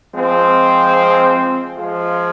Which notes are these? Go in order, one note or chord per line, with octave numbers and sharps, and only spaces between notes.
F3 G#3 C4
F3 G#3 F4